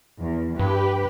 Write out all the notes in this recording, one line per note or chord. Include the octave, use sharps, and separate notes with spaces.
E2
G2 G4 B4